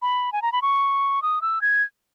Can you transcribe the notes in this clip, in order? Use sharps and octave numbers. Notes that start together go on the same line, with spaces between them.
B5
G#5
A#5
B5
C#6
D#6
E6
G#6